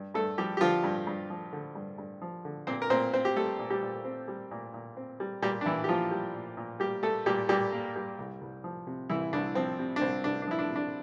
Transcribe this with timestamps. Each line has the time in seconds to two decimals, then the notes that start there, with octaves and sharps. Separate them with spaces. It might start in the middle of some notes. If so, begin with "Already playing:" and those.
Already playing: G2
0.14 G2 A3 A4
0.38 F3 G3 G4
0.57 G4
0.61 D3 F3 F4
0.84 G2
1.07 G2
1.30 F3
1.53 D3
1.75 G2
1.98 G2
2.22 F3
2.45 D3
2.67 A#2 C4 C5
2.82 A#4
2.90 A#2 C4 C5
3.13 C4 C5
3.25 G4
3.36 G3 A3 A4
3.59 A#2
3.70 G3 G4
3.82 A#2
4.05 C4
4.28 G3
4.51 A#2
4.74 A#2
4.97 C4
5.20 G3
5.42 A#2 G3 G4
5.61 D4
5.65 A#2 E3 E4
5.84 G4
5.88 F3 A#3 F4
6.11 G3
6.34 A#2
6.57 A#2
6.80 G3 A#3 G4
7.03 G3 A3 A4
7.26 A#2 G3 G4
7.49 A#2 G3 G4
7.72 A#3
7.96 G3
8.19 C2
8.41 C2
8.64 F3
8.87 C3
9.09 C2 E3 E4
9.33 C2 D4
9.55 F3 C4
9.79 C3
9.96 D4
10.01 C2 C4
10.24 C2 D4
10.42 D4
10.47 F3 E4
10.59 D4
10.70 C3
10.76 D4